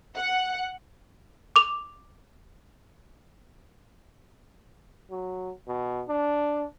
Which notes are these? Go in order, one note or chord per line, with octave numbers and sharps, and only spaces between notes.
F#5
D6 F7
F#3
B2
D4